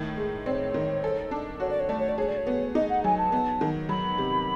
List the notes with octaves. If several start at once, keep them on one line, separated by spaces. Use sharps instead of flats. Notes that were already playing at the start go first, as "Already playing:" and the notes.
Already playing: A2 D#3
G#3
C4 C#5 D5
D#3
A4
D4
F#4 C#5
D5
C#5
A3 D5
C#5
D5
G#4 C#5
D5
C#5
B3
D#4 D#5
F#5
F#3 G#5
A5
B3
D#3
F#3 B5
C3